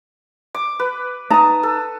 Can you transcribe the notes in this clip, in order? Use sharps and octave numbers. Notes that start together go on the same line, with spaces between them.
D6
B4
D#4 A5 A#5 D#6
A4